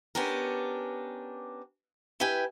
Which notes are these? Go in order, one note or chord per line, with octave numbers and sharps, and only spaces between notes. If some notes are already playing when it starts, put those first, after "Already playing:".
B3 C#4 D4 G4 A#4
E4 G4 B4 G5 G#5